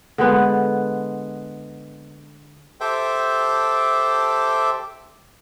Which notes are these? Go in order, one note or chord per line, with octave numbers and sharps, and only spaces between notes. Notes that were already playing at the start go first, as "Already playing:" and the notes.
D3 G#3 B3
G4 A4 C5 E5 G5 D6